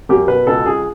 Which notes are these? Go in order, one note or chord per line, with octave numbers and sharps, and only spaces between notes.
F#2 G4
B2 B4
C#2 A4
C#2 G#4